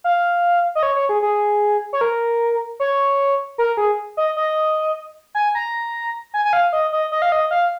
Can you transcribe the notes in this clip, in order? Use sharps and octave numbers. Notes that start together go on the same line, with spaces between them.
F5
D#5
C#5
C#5
G#4
G#4
C#5
A#4
C#5
A#4
G#4
D#5
D#5
G#5
A#5
G#5
G#5
F5
D#5
D#5
D#5
F5
D#5
F5